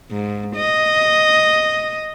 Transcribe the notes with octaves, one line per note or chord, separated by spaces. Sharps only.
G#2
D#5